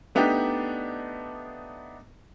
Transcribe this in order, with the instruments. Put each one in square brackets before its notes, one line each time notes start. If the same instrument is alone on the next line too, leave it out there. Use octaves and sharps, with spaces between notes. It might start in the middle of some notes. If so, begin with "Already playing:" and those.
[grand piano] A3 B3 D4 D#4 G4